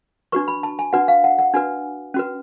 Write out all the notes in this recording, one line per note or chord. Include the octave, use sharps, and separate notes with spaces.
D4 F#4 B4 C#6
B5
A5
G#5
D4 F#4 B4 F#5
F5
F#5
F#5
D4 F#4 B4 G#5
C#4 F#4 B4